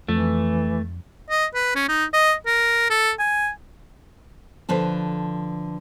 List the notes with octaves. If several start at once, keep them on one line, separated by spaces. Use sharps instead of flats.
F2 E3 A3
D#5
B4
C#4
D#4
D#5
A#4
A4
G#5
D3 F3 B4 A5